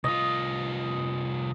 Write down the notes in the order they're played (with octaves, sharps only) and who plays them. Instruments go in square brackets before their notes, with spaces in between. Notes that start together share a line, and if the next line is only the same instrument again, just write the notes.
[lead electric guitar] C2 F4 [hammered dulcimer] D#5